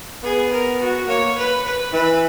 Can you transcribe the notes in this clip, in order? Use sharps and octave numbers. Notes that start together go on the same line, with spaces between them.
B3 G#4
A#4
F#4
A#3 C#5
B4
B4
E3 B4